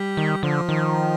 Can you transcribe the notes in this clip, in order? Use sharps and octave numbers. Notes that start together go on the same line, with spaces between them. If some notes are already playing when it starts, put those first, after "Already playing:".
Already playing: G3
D#3
D3 F3
D#3